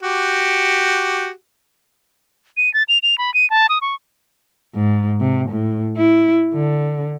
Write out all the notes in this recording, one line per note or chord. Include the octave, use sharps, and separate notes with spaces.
F#4 G4
D#7
A6
F7
F7
B5
D#7
A5
D#6
C#6
G#2
C3
A2
E4
D3